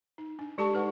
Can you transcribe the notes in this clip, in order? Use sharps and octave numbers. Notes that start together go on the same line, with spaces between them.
D#4
D4
G#3 G4 A4 A5 C#6
D#4 B4 F#5